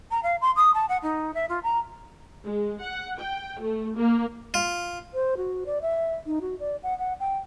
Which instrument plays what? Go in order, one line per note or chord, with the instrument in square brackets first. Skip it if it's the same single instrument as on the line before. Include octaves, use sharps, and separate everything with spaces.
[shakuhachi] A#5
F5
C6
D#6
A5
F#5
D#4
E5
F4
A#5
[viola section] G#3
F#5
G5
A3
A#3
[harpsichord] F4
[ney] C5
F#4
D5
E5
D#4
F#4
D5
F#5
F#5
G5